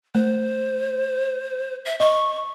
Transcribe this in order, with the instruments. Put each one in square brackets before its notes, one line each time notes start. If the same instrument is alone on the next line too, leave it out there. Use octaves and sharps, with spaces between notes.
[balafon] A3 [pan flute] C5
[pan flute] E5
[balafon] D#5 [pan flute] C#6